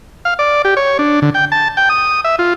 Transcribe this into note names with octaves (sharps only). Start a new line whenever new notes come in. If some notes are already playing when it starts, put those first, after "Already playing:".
F5
D5
G4
C#5
D4
D3
G5
A5
G5
D#6
E5
F4